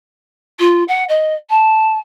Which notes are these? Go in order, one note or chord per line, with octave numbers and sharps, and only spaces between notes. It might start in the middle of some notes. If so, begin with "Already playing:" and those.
F4
F#5
D#5
A5